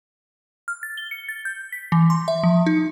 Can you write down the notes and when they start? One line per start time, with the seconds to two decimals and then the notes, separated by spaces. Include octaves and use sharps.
0.68 F6
0.83 A6
0.98 G7
1.11 C#7
1.29 A6
1.45 G6
1.72 B6
1.92 E3
2.10 C6
2.28 E5
2.43 F3
2.66 D#4